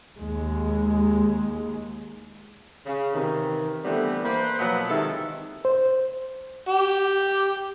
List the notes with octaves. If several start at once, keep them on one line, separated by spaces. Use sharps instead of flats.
D#2 G#3
C#3
C3 D#3 E3
D3 E3 G3 A3 B3 C4
A#3 B4 C5
B2 F3 F#3 A#3 B3
C3 D#3 E3 G#3 E4 A4
C5
G4